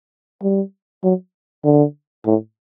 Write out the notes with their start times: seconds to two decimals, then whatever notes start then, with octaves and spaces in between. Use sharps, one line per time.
0.42 G3
1.04 F#3
1.64 D3
2.26 A2